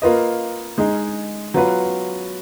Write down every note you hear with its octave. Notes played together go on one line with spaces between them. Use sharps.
A#3 F4 B4 D#5
G#3 D#4 G#4
F#3 B3 F4 B4